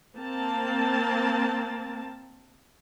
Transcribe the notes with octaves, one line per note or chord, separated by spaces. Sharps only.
A#3 C4 A5